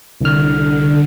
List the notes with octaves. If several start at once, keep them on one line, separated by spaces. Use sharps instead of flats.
C2 D3 F6